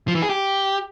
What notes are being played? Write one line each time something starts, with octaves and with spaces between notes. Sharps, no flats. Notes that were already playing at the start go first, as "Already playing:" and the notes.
F3
E3
G#4
G4